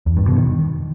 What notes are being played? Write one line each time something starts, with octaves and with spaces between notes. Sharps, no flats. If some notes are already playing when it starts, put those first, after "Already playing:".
E2
G2
B2
D#3